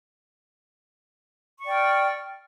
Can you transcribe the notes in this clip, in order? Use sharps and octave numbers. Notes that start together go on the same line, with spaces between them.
D5 G5 C#6 F6